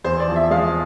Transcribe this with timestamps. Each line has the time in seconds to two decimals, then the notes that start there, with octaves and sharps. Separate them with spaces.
0.04 E2 C5
0.20 D5
0.28 F3
0.36 E5
0.51 G#3 F5